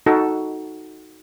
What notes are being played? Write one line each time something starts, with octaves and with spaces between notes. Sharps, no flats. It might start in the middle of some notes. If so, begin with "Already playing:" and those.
D#4 F#4 A4